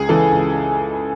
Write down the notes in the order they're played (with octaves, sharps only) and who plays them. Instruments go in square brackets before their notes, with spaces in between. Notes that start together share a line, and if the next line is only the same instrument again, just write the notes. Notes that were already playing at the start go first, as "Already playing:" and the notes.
Already playing: [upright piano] C#2 G#4
C#3 E3 A4
C#2